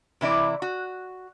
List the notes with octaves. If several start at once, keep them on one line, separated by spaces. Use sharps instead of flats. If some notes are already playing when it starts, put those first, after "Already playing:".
C3 E3 E4 D5
F#4